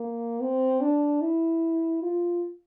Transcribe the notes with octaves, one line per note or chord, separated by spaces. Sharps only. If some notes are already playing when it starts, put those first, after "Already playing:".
Already playing: A#3
C4
D4
E4
F4